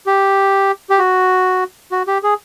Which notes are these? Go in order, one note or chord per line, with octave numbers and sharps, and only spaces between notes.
G4
G4
F#4
F#4
G4
G#4